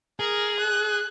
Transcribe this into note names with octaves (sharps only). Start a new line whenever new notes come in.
G#4 A#4
F#6